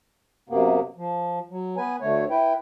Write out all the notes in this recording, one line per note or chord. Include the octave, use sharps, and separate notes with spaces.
F#2 C3 A#3 B3
F3
F#3
B3 B4 G#5
D2 D3 A3 C#5
E4 B4 G5